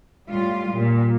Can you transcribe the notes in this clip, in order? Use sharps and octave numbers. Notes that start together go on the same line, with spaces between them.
A2 G3 F4
A#2 G3